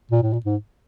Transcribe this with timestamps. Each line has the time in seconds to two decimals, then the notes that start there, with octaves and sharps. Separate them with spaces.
0.11 A#2
0.22 A2
0.33 A#2
0.46 G#2